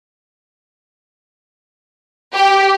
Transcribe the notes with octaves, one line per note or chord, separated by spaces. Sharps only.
G4